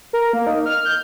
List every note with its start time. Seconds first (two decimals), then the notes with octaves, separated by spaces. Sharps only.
0.13 A#4
0.33 A#3
0.47 D#4
0.66 F6
0.85 G6